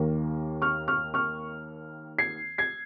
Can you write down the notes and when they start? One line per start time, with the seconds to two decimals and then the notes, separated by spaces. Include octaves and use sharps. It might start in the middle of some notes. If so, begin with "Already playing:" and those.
Already playing: D#2 D#3 A#3
0.62 C#6 F6
0.88 C#6 F6
1.14 C#6 F6
2.19 G#6 C7
2.58 G#6 C7